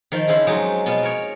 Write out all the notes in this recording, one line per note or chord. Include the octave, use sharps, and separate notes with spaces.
D#3 F3
C#3 F3 C4 E4 B5 C6
F3 F#3 G#3 D#4
B2 B3 F4
A#4 C#5